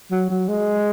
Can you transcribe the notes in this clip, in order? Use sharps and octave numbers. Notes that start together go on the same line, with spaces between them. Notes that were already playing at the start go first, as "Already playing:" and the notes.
F#3
F#3
G#3